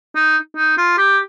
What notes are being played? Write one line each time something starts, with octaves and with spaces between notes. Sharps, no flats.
D#4
D#4
F4
G4